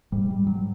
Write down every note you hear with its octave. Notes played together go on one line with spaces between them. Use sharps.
G#2 G3
G3
F#3